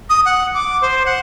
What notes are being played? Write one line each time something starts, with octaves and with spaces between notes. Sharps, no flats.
D#6
F#5
D6
C5
F#5